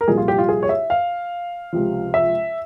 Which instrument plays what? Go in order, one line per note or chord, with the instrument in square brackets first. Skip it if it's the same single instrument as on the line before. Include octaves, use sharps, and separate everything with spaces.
[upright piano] A#4
C2 A#2 F3 G#4
F4
G4
F4
G#4
C#5
E5
F5
C#2 C3 F3
E5